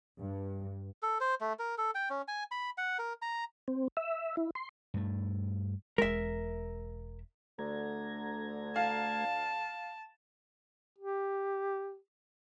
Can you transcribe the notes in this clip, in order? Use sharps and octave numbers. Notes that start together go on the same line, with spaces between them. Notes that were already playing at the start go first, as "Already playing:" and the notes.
G2
A4
C5
A3
A#4
A4
G5
C#4
G#5
B5
F#5
A#4
A#5
C4
E5
E4
C6
G2 A3
E1 G#3 A#4 E5
D2 D3 A3 A#5 G#6
F5 A5
G4